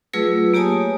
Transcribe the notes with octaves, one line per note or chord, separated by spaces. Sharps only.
F#3 A3 F4 G#4 B4 E6
A#3 G4 C#5 G#5 A5 D#6